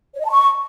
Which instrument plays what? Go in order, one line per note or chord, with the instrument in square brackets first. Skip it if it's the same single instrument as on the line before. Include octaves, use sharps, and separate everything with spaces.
[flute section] C#5
D#5
A5
C#6